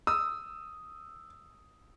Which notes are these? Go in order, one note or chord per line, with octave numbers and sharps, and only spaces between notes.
D#6 E6